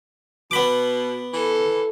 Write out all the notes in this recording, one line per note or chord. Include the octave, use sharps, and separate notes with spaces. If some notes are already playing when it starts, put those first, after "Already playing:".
B2 B3 B5 D6
E3 A4